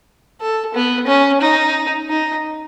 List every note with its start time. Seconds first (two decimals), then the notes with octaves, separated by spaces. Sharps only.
0.41 A4
0.74 B3
1.07 C#4
1.41 D#4
2.09 D#4